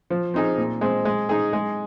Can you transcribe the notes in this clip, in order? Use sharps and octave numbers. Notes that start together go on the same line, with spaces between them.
F3
C4 D#4 G#4
A#2
G#3 C4
G#3
D#4 G#4
G#3